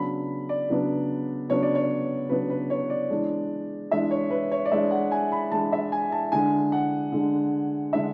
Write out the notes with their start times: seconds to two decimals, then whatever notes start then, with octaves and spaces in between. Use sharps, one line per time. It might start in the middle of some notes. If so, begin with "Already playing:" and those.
Already playing: C#3 F#3 B3 D4 B5
0.49 D5
0.69 C#3 F#3 B3 D4
1.49 C#3 F#3 B3 D4 C#5
1.63 D5
1.75 C#5
2.29 C#3 F#3 B3 D4 B4
2.50 B4
2.70 C#5
2.90 D5
3.10 E3 G#3 D4
3.91 E3 G#3 D4 E5
4.11 C#5
4.30 B4
4.52 C#5
4.65 D5
4.71 E3 G#3 D4 E5
4.91 F#5
5.12 G#5
5.32 B5
5.51 E3 G#3 D4 A5
5.72 E5
5.92 G#5
6.12 A5
6.32 D3 G#3 D4 G#5
6.72 F#5
7.12 D3 G#3 D4
7.93 D3 G#3 D4 E5